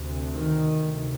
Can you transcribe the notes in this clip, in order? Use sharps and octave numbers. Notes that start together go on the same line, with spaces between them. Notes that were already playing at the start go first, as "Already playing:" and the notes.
Already playing: D2 C3
D#3
D2 C3